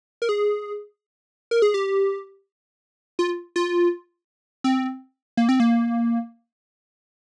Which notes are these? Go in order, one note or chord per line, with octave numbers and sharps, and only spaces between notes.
A#4
G#4
A#4
G#4
G4
F4
F4
C4
A#3
C4
A#3